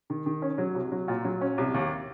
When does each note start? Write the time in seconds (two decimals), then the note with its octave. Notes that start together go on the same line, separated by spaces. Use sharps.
0.10 D#3
0.26 D#3
0.42 C#4
0.58 F#3
0.75 C2
0.92 F#3
1.08 A#2
1.24 F#3
1.41 C#4
1.58 C2
1.74 D#2